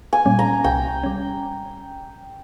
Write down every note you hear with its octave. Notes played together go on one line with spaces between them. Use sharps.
G#5
A#2 G3 C#4
A#5
C2 G5
G3 C#4